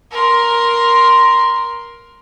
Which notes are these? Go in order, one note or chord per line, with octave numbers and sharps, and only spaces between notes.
A#4 C6